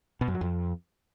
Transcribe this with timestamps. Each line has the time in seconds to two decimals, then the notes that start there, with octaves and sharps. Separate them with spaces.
0.21 B2
0.28 F#2
0.34 F#3
0.41 F2